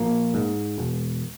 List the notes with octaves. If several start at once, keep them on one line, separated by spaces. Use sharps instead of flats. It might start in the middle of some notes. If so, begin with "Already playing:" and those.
Already playing: A#1 A#3
G#2
E1